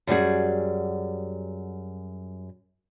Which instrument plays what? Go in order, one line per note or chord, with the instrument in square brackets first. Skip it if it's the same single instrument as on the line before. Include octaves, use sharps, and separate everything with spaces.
[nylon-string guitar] F#2 G3 F#4 G#4